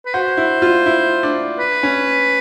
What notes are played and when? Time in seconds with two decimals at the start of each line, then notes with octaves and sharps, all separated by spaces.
0.06 B4
0.14 F#4 C5
0.37 E4
0.62 F4
0.86 E4
1.23 D4
1.59 B4
1.83 C#4